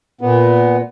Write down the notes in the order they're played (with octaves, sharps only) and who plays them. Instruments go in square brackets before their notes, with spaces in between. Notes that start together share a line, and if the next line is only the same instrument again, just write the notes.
[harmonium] A#2 B3